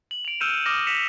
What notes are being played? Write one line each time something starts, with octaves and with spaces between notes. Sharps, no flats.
F#7
D7 F7
E6 F6 G6 C#7 D#7 E7
D6 D#6 F6 A#6 E7
A#6 B6 C#7 E7 F7